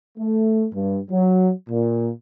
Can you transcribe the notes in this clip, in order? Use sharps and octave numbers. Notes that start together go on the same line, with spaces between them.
A3
G2
F#3
A#2